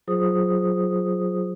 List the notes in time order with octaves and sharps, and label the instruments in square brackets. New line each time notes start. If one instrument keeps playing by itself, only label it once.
[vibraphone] F#3 F4 G#4 C5 D#6